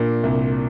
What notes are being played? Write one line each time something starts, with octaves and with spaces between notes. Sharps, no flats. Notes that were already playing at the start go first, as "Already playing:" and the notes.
Already playing: A#2 D4
C2